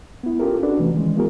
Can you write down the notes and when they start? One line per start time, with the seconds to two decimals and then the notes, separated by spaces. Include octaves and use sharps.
0.23 B3 E4
0.40 C#4 F4 G4 A4 A#4
0.63 D4 F#4 B4 D5
0.79 C3 E3 A3 C#4
0.94 D#3 E3 G#3
1.16 A#3 B3 E4 F#4 G#4 A#4